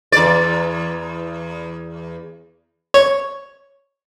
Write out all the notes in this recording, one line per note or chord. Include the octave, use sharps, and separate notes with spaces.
E2 D5
C#5